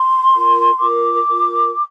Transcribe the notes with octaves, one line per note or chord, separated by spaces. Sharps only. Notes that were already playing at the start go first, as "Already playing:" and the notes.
Already playing: C6
F4 A#4
F4 A#4 D6
F4 A#4